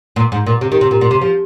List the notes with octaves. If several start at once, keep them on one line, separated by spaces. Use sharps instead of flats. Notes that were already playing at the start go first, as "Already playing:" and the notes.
A#2
G#2
A#2
C3
D#3
C3
A#2
A#2
C3
F3